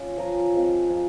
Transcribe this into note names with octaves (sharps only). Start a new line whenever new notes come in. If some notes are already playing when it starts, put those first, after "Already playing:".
Already playing: C#4 F4
F3 G#5 A#5
G#3 C4 F4
F3